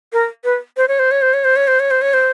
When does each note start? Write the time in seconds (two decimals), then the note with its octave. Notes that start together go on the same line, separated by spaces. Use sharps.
0.13 A#4
0.44 B4
0.77 C5
0.88 C#5
0.99 C5
1.11 C#5
1.22 C5
1.34 C#5
1.44 C5
1.56 C#5
1.68 C5
1.80 C#5
1.91 C5
2.02 C#5
2.14 C5